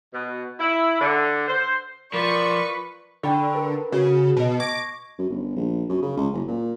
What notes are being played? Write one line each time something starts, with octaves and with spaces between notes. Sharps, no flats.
B2
E4
D3
C5
F3 A#4 B4 D5 C#6
D3 G5 B5 C#6
A#4 B4
C#3 F#4
B2 D#5 A5
C#6 D6 G#6 A#6
F#2
G1
A#1
F#2
C#3
C#2
F#1
A#2